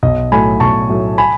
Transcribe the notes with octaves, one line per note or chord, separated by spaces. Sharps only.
B1 D#5
A2 F#3 A3 G#5 B5
B1 A5 C#6
A2 F#3 A3
G#5 B5